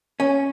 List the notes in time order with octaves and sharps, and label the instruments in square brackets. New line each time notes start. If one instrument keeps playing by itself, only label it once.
[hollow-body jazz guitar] C#4